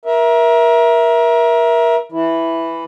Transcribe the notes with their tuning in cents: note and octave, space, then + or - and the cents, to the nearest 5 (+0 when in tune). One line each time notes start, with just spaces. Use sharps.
A#4 +25 E5 +0
E3 +0 E4 +0